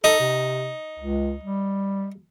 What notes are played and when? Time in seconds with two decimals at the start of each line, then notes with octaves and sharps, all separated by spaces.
0.04 D#4 A4
0.20 C3
1.00 C#2
1.44 G3